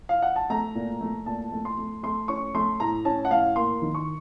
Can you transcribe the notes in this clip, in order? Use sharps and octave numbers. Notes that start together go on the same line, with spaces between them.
F5
F#5
A5
A3 A#5
A#2
A3
A#2 A5
A3
C6
A3
A3 C6
C#4 C#6
A3 C6
A2 A#5
C#4 A5
F#5
A2 F5
A#3 C6
D#3
C#6